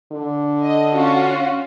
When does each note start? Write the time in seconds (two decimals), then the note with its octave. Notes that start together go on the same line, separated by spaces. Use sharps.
0.12 D3
0.63 D#5
0.93 C#4 F4 F#4